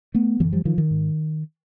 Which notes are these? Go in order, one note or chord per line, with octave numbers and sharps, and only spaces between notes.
A3 B3
F#2 D3 E3 F#3
F3 G3
D#3 F3
D#3
G#2